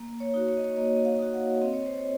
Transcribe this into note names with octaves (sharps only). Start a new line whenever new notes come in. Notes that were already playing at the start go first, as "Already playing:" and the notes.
Already playing: A#3
C#5
D#4 F#4
C#5
D#5
C#5
A#3 D#5
D#5
F5
D#4 F#4
F#5
C4 D#5
C#5
C5
C#5